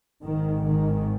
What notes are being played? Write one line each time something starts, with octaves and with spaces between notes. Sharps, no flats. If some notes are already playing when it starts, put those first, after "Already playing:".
G#1 G#2 D#3
D#3